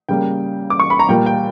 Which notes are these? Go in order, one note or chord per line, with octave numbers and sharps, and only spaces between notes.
C#3 G3 A#3 G5
D6
C#6
B5
A#5
A#2 G3 A#3 G5
G5